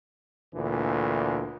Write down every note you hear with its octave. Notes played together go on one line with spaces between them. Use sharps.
D2 A#2 E3 D4